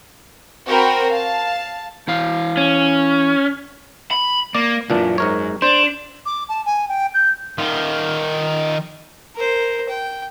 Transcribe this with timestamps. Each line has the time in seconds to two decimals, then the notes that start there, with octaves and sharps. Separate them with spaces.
0.67 C4 F#4 A#4 G5 B5
1.09 F5 A5
2.08 E3 E4 F5
2.57 C#4
4.11 B5
4.55 A#3 D5
4.90 C#2 F#2 A#2 E3 D4
5.18 G#2 A#4 C#5
5.62 D4 C5
6.25 D6
6.49 A5
6.65 G#5
6.88 G5
7.14 G6
7.58 D#3 F4
9.35 A#4 C5
9.89 G5